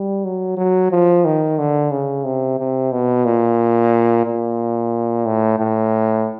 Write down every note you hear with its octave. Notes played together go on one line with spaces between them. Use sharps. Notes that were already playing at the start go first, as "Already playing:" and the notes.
Already playing: G3
F#3
F#3
F3
D#3
D3
C#3
C3
C3
B2
A#2
A#2
A2
A2